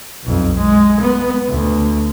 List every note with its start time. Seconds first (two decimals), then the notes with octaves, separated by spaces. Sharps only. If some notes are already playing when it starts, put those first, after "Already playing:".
0.24 B1 F2
0.57 G#3
1.01 B3
1.50 D2